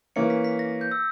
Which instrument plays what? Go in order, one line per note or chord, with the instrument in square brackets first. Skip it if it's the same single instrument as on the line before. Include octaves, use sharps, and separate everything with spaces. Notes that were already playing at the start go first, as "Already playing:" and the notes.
[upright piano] E3 A#3 C#4 [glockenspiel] C#7
[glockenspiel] B6
B6
A#6
G6
E6